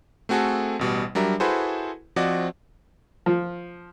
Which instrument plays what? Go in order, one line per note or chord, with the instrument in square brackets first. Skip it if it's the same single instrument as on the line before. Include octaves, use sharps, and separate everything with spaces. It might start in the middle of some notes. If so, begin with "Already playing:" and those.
[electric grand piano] A3 C4 F#4 G#4 A4
A1 B2 G3
F#3 G3 D4 A#4 E5
E4 F#4 G#4 A4 B4 C5
F3 C4 F#4 D5 D#5
[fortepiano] F3